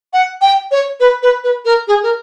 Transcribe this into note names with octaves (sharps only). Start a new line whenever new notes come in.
F#5
G5
C#5
B4
B4
B4
A#4
G#4
A#4